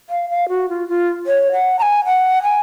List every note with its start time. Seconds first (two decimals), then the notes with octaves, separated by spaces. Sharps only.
0.10 F5
0.30 F5
0.49 F#4
0.69 F4
0.89 F4
1.27 C#5
1.52 F#5
1.79 A#5
1.82 G#5
2.05 F#5
2.43 G#5